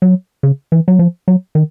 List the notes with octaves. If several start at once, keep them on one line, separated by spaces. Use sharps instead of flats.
F#3
C#3
E3
F#3
F3
F#3
D#3